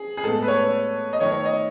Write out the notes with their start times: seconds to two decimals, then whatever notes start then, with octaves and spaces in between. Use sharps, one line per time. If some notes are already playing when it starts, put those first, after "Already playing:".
Already playing: G#4
0.17 G#4
0.24 A2 G#3 B3 A4
0.42 B4
0.48 C#5
1.13 D#5
1.20 D#3 A3 C#5
1.32 C#5
1.45 D#5